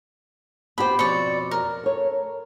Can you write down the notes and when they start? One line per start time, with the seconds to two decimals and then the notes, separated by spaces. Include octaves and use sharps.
0.78 B3 G4 C5 B5
0.99 F2 B2 C#5 D5
1.51 A#4
1.84 A4 C#5